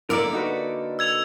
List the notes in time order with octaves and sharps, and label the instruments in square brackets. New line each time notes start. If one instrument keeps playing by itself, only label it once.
[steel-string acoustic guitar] D3 A#3 A4 [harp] E4 D6 [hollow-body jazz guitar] A#4 D5
[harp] D#4 F#4 B4
[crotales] E6 G#6 F7